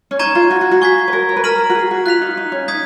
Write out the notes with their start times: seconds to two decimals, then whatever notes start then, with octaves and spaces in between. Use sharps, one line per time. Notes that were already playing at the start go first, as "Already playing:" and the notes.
0.11 C#4
0.19 D#4 A#5 C#6 G#6 D#7
0.35 F4
0.51 F#4
0.61 F#4
0.71 F#4
0.81 G#4 C#6 G#6 B6
1.08 B4
1.13 A#4
1.29 C#5
1.36 B4
1.43 A#4 A#5 F6 B6 D#7 F#7
1.70 F#4
1.75 G#4
1.91 F#4
2.06 F4 F#6 B6 F7
2.21 D#4
2.37 D#4
2.52 C#4
2.68 D#4 D#6 G#6 B6